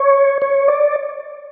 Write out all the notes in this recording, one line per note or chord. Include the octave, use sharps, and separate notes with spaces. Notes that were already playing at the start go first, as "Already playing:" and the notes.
Already playing: C#5
C#5
D5